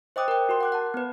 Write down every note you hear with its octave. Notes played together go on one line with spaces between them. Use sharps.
C5 D#5 G5 D6 D#6 F#6
A#4 G5
F#4 A#4 C6
F#5 D6 F#6
F#5 A5
B3 B4